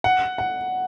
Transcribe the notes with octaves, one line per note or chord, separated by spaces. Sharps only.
F#5
F#5